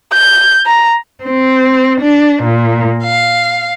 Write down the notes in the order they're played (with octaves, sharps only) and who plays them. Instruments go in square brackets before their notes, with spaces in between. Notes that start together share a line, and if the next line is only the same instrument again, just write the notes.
[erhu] G6
A#5
[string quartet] C4
D4
A#2
F5